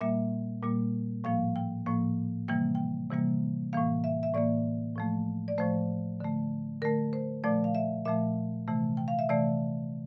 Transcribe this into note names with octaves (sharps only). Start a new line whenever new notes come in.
A#2 G3 A#3 E5
A#2 G3 A#3
A2 F3 A#3 F5
G5
A2 F3 A#3
C3 E3 G3 A#3 G5
G5
C3 E3 G3 A#3
A2 E3 A#3 F5
E5
E5
A2 E3 A#3 D5
A2 F3 A3
D5
A2 F3 A3 C5
D3 A3
D3 A3 A#4
C5
A#2 F3 A3 D5
F5
E5
A#2 F3 A3 E5
C3 E3 A3
G5
F5
E5
C3 E3 A3 D5